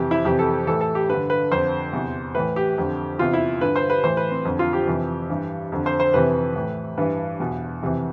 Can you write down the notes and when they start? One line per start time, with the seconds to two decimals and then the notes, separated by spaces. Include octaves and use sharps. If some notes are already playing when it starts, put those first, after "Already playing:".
Already playing: F2 C3 E3 G4
0.11 E4
0.25 F2 C3 E3 G4
0.39 A4
0.67 A2 E3 A4
0.81 A4
0.95 G4
1.09 G2 D3 B4
1.30 B4
1.51 F2 D3 C5
1.93 E2 C3 E3
2.35 A2 E3 B4
2.56 G4
2.78 F2 D3
3.19 E2 C3 E3 F4
3.33 E4
3.61 G2 D3 B4
3.76 C5
3.90 B4
4.04 A2 E3 C5
4.17 B4
4.31 C4
4.45 F2 D3
4.59 F4
4.73 G4
4.87 F2 C3 E3
5.30 G2 E3
5.72 F2 D3
5.86 C5
6.00 C5
6.14 F2 C3 E3 B4
6.56 A2 E3
6.97 G2 E3 B4
7.40 E2 B2
7.82 F2 C3 E3